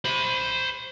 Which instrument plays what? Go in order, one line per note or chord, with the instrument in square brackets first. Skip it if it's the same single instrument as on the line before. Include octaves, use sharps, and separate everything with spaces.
[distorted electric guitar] C5 B5